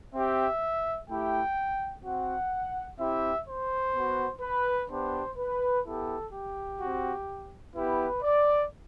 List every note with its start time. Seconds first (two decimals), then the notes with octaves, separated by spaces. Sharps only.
0.13 C4 G4 E5
1.09 A3 E4 G4 G5
2.03 C4 F#4 F#5
2.98 C4 E4 G4 E5
3.47 C5
3.94 B3 F#4
4.41 B4
4.89 B3 D4 G4 C5
5.37 B4
5.84 B3 E4 G4 A4
6.32 G4
6.79 C4 F#4
7.74 B3 E4 G4 B4
8.22 D5